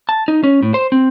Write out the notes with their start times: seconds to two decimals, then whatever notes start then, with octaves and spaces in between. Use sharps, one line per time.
0.09 A5
0.28 D#4
0.44 C#4
0.63 A2
0.74 C5
0.92 C4